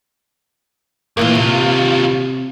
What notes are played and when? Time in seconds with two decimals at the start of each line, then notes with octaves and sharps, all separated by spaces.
1.17 D#2 A#2 E3 A#3 F4
1.35 C3